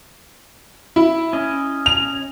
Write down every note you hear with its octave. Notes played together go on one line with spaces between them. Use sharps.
E4
C#4 D#5
F7